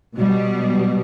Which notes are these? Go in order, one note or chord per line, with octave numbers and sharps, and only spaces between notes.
B2 G3